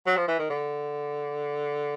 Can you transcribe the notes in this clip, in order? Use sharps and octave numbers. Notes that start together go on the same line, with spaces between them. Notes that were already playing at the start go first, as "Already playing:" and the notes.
F#3
F3
E3
D#3
D3